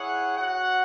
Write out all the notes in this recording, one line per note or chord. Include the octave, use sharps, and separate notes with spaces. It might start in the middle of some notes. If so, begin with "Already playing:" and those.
Already playing: E4 G#4 C#5 F#5
F#4 C#5 F#5